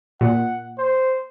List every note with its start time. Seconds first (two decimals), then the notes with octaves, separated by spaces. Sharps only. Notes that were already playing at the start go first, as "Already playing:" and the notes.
0.21 A#2 F#5
0.78 C5